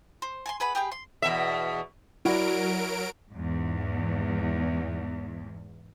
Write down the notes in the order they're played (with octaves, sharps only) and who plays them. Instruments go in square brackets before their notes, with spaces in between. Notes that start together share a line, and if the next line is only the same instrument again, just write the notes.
[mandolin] C5
G#5 A5 C6
G#4 B4 F#5 B5
G4 G#4 B4 G5
C6
[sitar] E2 B2 E5
[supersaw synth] F#3 A#4 D7 [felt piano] E4 F#4 D5
[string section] E2 G#2